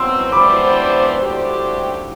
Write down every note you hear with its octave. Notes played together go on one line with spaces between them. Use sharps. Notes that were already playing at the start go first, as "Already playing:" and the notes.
Already playing: B2 F#3 C4 C6 E6
E3 B3 D4 G4 C5 B5 D6
F#3 A3 D4 G4 C5